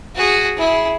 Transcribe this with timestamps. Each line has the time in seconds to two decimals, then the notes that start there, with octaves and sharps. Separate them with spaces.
0.15 F#4 G#4
0.57 E4 G#4